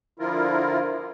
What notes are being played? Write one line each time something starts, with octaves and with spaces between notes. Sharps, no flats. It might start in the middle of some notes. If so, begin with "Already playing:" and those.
D3 F3 E4 F4 A#4